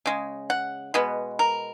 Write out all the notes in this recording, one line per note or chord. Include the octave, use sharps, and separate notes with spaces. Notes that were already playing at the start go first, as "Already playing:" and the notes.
C#3 G#3
F#5
B2 G#3 B3
A#4